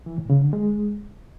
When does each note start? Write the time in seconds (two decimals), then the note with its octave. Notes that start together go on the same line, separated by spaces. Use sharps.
0.06 E3
0.18 A2
0.30 C#3
0.41 D3
0.53 G#3